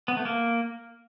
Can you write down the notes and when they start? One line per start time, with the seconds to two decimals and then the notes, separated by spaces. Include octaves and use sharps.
0.08 B3
0.17 A3
0.25 A#3